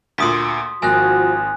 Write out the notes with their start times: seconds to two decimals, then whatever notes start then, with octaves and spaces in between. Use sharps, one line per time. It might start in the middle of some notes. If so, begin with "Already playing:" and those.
0.18 D2 A#2 C6 D#6 B6
0.82 G#1 F3 A#3 F#4 G#5 F#6 A#6